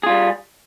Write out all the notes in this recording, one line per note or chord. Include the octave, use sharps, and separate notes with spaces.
G3 F4 G#4